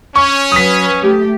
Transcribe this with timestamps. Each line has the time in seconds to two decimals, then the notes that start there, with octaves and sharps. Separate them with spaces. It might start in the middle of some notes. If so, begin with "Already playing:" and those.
0.16 C#4 C#6
0.52 F#3 B4 D#6 B6
1.01 A3 G4